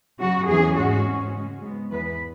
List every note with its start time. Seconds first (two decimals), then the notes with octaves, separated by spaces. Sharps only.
0.19 F#2 C#3 F#3 F#4
0.48 E2 E3 C#4 G#4
0.77 G#2 G#3 C#4 F#4
1.05 G#2 G#3 C#4
1.33 C#3 G#3 C#4
1.62 G#2 G#3 B3
1.91 E2 E3 B3 B4